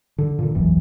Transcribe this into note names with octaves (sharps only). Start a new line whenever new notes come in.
D3
A#2 D3
E1 A#1 F#2 E3